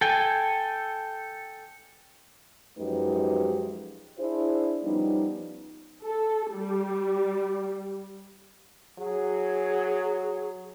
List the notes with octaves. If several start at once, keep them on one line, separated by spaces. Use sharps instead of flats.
A4 G5 G#5
F#2 F3 G#3 D#4 G4 B4
D4 E4 G#4 C5
F3 G3 B3 C#4 D#4
A4
G3
F#3 G#4